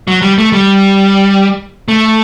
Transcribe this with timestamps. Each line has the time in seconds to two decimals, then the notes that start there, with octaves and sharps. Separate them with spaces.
0.08 F#3
0.22 G3
0.38 A3
0.52 G3
1.88 A3